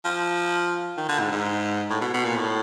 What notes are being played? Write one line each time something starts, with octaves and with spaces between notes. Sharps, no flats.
F3
D#3
D3
G#2
G#2
A2
B2
B2
A#2
A2